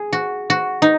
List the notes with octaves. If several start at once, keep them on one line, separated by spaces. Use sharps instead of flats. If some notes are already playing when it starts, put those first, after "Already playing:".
Already playing: G#4
F#4
F#4
D#4